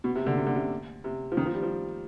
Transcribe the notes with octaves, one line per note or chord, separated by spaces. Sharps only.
B2
C3
D3
C3
D3
C3
C3
F3
D#3
F3
G3
F3